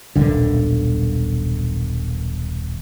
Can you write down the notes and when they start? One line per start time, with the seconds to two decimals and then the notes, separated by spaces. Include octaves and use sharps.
0.16 D#1 B1 D3